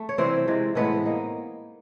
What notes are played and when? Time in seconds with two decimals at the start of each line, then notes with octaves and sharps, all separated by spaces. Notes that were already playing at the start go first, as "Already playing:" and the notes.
Already playing: A3
0.09 C#5
0.18 C3 E3 G3 C4 C5
0.47 C3 E3 G#3
0.75 A2 E3 G#3 B3 C4 B4
1.06 A#3 D#4